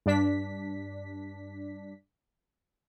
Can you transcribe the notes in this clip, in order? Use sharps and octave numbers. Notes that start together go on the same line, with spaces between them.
G2 D4 B6